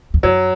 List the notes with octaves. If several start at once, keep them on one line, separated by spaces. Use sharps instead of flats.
E2
F#2 F#3